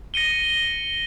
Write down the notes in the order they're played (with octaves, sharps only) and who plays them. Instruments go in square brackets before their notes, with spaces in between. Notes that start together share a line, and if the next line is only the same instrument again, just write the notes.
[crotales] A#6 C#7 D#7 G7